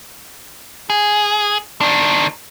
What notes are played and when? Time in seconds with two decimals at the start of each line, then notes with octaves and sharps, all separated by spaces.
0.90 G#4
1.81 D#3 D4